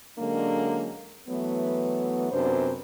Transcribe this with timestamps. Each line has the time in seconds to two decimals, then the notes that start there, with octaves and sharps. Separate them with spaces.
0.17 D3 F#3 G#3 A#3 C#4 D4
1.28 E3 F#3 A3 B3
2.32 F#2 C3 B3 D4 B4 C5